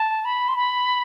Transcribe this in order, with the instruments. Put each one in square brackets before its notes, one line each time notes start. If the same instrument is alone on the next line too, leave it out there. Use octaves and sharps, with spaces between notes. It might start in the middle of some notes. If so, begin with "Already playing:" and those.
Already playing: [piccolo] A5
B5
C6
B5